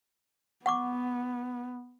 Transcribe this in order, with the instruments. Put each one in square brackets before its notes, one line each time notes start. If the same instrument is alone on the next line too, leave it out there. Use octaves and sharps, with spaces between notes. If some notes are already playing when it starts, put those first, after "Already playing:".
[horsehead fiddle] B3 [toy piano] F#5 C#6 D6